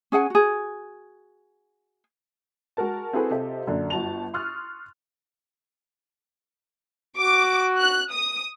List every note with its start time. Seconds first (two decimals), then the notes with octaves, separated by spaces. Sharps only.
0.12 C#4 G#4 F#5 G#5
0.30 F#4 G#4
2.77 G#3 F#4 A#4 A5
3.13 C4 E4 F#4 G#4 A4 B4
3.30 C3 F4 G4 A4 D#5
3.67 F#2 A#2 D3 D4
3.90 G1 F#4 A5 F7
4.34 C6 C#6 D#6 F6 F#6 A6
7.18 F#4 D6
7.79 F#6
8.13 D#6